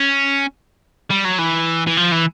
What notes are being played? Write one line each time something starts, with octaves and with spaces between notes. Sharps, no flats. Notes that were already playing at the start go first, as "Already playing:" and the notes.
Already playing: C#4
G3
F#3
E3
E3
F3
E3